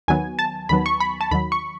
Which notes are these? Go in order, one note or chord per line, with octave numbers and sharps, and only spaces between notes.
D#2 D#3 F#3 B3 G#5
A5
D#2 D#3 F#3 B3 B5
C#6
B5
A5
D#2 D#3 F#3 B5
C#6